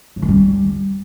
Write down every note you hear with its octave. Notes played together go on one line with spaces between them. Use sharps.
A2
D#3
G3